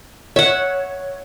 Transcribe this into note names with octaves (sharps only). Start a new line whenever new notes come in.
C#5 E5 F#5